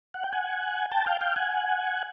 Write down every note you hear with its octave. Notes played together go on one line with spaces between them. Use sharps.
F#5
G5
F#5 G#5
G5 A5
F5 G5
F5 G5
F#5 G#5